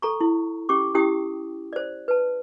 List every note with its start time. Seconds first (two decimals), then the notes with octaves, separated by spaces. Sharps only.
0.02 A4 A#5 C#6
0.21 E4
0.69 C#4 G4 C#6 D6
0.95 C#4 E4 G4 G5 D#6
1.73 C5 D5
2.08 B4 A5